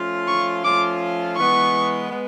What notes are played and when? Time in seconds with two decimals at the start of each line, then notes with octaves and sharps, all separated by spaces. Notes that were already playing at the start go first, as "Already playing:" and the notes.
Already playing: F3 A3 C#4 F4
0.28 C#6
0.64 F3 A3 C#4 F4 D6
1.37 E3 G#3 B3 C#6
2.10 G#3 B3